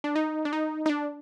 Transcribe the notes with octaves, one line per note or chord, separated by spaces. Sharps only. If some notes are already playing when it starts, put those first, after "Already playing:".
D4
D#4
D4
D#4
D#4
D4